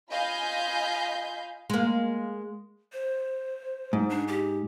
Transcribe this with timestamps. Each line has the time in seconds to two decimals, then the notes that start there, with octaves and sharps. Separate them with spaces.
0.11 F4 D#5 F5 G#5 B5 G6
1.70 G#3 A#3
2.92 C5
3.93 G#2
4.10 D4
4.28 G4